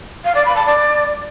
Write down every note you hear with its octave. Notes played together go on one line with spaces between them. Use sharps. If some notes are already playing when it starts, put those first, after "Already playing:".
F5
D5
B5
A5
D5